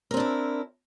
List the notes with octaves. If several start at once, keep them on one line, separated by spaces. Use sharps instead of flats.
C4 D4 E4 A#4